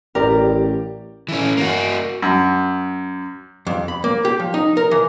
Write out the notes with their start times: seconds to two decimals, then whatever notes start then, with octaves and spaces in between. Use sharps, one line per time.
0.15 A1 G4 A#4 D5
1.28 E3 C#4
1.57 A#3 F#4
2.22 F#2
3.67 F2
3.88 B5
4.04 A#3
4.25 G4
4.40 F3
4.54 D#4
4.77 A#4
4.91 E3